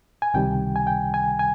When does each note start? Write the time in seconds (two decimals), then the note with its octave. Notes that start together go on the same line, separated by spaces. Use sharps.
0.22 G#5
0.34 C#2 C3 D#3 G3 G5
0.76 G#5
0.87 G5
1.14 G#5
1.39 G#5